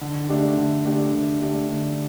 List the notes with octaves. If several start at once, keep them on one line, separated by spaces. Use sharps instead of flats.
D3
A3 D4 G4
D3
A3 D4 G4
D3
A3 D4 G4
D3